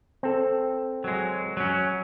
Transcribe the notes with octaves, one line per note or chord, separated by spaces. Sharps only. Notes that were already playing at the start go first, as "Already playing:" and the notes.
C4 A4
F#3 G#3
F#3 C#4